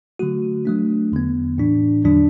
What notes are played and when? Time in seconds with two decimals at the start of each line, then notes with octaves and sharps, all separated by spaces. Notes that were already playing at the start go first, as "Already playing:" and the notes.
0.19 D3 F#3 A3 F#4
0.65 F#3 A3 D4
1.12 E2 D3 B3
1.58 A2 E3 D4
2.05 E2 D3 F#3 D4